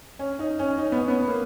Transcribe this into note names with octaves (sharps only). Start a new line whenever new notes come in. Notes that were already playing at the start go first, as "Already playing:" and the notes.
C#4
D#4
C#4
D#4
B3
C#4
B3
A#3